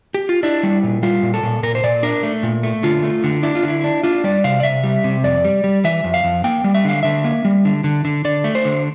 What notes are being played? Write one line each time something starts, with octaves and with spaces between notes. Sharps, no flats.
G4
F4
D4 E4
G3
A#2
G3 F4
A#2
A4
A#2
A#2 A#4
C5
A#2 D5
D4 A#4
A3
A#2
A3
D3 F4
A3
D3
D4 E4
F4
D3 E4
D4
D4 F4
G3 D5
C3 F5
D5
C3 E5
G3
C3
F2 D5
G3
G3
E3 E5
F2
F5
F2
A#3 G5
G3
E5
D3 F5
D3 E5
A#3
G3
D3
D3
D3
D3 D5
A3
C5
D3